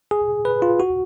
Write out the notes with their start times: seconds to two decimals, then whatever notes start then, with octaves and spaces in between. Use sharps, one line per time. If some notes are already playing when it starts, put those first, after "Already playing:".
0.11 G#4
0.45 B4
0.62 F4
0.80 F#4